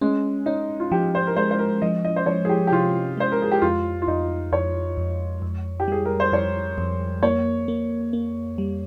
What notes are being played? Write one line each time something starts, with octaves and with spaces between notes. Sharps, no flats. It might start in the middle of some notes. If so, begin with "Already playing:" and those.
G#3 C#4
C#4 D#4
F4
F3 G4
C5
A#4
G#3 C5
C5
A#4
F3 D#5
D#5
C5
F3 C#5
G#4
G4
G4
C3 F4
G#3 C5
A#4
G#4
G4
F2 F4
F4
F2 D#4
F2 C#5
F2
F2
G4
G3 G#4
A#4
C5
F2 C#5
F2
A#3 C#5
A#3
A#3
G3